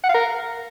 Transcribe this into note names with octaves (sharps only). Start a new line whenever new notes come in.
F#5
F5
A#4